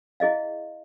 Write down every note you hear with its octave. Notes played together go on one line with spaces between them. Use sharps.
E4 G#4 D#5 F5